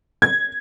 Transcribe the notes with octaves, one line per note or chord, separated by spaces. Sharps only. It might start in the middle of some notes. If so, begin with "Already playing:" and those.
G#6